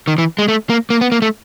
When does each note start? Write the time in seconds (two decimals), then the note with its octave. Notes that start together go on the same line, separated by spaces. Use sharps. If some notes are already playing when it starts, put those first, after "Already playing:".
0.08 D#3
0.18 E3
0.39 G#3
0.48 A3
0.70 A#3
0.90 A#3
1.01 B3
1.12 A#3
1.22 A3